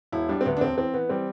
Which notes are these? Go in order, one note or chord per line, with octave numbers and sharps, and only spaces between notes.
E1 E4
G3 D4
C4
D2 B3
D4
E1 C4
E3 C4
E3 B3
G3 C4